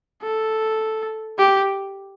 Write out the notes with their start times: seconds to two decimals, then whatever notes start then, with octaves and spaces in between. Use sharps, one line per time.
0.22 A4
1.38 G4